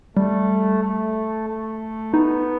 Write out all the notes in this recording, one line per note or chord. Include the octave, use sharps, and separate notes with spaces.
G3 A3
A3
A3
B3 D#4